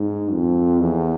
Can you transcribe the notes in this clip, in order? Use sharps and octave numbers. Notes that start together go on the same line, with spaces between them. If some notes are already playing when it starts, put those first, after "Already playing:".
Already playing: G#2
F2
E2